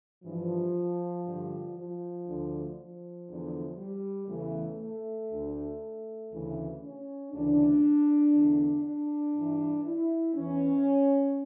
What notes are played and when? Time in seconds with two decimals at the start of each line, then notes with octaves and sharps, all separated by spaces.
0.24 G2 E3 F3
1.26 G2 D3
1.76 F3
2.26 D2 D3
2.77 F3
3.28 E2 D3
3.78 G3
4.28 E2 C#3 E3 A3
4.80 A3
5.31 D2 D3
6.31 D2 C#3 E3
6.82 C#4
7.32 D2 C#3 E3 D4
8.33 E2 D3
8.84 D4
9.34 G2 E3
9.86 E4
10.36 E2 E3 C#4